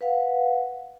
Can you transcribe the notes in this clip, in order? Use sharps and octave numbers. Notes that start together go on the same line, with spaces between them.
B4 F5 F#5